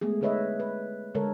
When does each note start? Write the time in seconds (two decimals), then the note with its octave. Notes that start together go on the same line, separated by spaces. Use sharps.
0.01 G#3 A3 B3 G#4
0.21 D3 D#4 B4 C#5 D#5 E5
0.60 B4
1.15 D3 G#3 A4 A#4 C#5